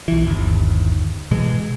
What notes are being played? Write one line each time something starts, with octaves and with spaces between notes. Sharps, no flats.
B1 E3
G1 D#2
A1 B2 E3 G#3